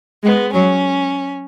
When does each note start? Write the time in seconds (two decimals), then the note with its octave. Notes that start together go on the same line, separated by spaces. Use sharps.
0.24 G#3 B3
0.53 F#3 C#4